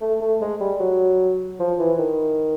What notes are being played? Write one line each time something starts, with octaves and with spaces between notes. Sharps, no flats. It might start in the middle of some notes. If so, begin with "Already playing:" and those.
A3
A3
G#3
G3
F#3
F3
E3
D#3